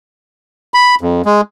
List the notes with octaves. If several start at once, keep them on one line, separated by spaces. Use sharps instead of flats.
B5
F2
G#3